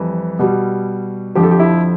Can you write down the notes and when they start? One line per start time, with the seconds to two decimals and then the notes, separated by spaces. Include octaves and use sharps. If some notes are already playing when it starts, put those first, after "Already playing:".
Already playing: F2 E3 G3
0.39 B2 G3
1.35 F2 D3 F3 G4
1.43 A4
1.51 G4
1.60 E4